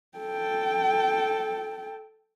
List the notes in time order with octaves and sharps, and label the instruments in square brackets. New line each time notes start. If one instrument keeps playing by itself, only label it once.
[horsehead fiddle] A4 G5